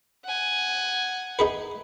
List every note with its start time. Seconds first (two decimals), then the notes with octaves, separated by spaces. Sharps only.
0.25 F#5 G#5
1.39 D#4 G#4 B4